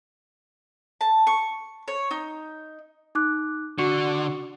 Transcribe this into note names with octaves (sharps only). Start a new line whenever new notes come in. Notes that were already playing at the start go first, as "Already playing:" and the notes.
A5
C#6
C#5
D#4
D#4 D6 F#6
D3 F#4 C#6 C#7